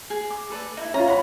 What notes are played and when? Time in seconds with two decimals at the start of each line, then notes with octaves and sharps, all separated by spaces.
0.10 G#4
0.31 D6
0.50 A4 B4 D5
0.77 D#4 E4
0.94 C#4 F4 A#5
1.07 C#5 F#5 B5